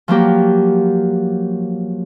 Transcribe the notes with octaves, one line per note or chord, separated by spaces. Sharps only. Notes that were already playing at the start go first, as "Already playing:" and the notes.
F3 F#3 A#3 G4